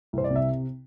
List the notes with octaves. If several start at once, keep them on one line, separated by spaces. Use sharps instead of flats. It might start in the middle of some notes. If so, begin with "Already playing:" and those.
C2 C5
D5
C3
E5